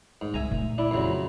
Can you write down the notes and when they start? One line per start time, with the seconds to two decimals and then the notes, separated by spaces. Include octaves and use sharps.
0.21 G#2
0.34 C2 E5 G#5 A#5
0.51 A#2 A3
0.78 D4 E4
0.91 F2 C#3 F#3